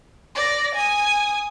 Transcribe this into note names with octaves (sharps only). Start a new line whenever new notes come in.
D5 A#6
G#5 D#6